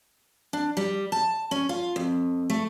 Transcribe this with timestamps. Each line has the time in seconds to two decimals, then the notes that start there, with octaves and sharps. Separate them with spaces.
0.53 D4
0.77 G3
1.12 A5
1.51 C#4
1.69 F4
1.96 F2
2.50 A3